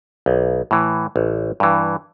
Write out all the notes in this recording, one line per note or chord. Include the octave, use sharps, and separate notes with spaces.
B1
A2 E3
A1
G2 E3